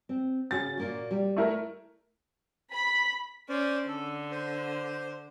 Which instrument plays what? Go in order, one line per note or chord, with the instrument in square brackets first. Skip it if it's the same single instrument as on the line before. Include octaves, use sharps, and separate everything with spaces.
[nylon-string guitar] C4
[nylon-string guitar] C#3 F#4 C#5 [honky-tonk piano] A6
[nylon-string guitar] A#2 A#3 F#4
G3
[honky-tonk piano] A3 E4 A#4
[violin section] B5
[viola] C#4 [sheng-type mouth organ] C5 D5
[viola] D3 [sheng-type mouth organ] A4
[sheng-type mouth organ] C5